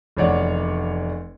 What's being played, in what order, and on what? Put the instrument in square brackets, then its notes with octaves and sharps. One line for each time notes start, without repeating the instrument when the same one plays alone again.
[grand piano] F1 E2 C#5 D5 F#5